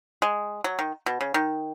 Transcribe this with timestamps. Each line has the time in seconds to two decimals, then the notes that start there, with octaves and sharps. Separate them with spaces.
0.22 G#3
0.64 F#3
0.79 D#3
1.06 B2
1.21 C#3
1.34 D#3